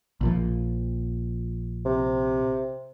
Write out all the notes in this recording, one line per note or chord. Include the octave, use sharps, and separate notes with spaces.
A#1 A#2 F3
C3